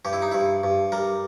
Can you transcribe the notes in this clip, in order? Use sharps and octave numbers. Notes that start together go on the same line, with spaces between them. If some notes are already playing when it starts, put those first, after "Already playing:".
G2 G4
E4
D#4
G2 E4
G2
G3 A#4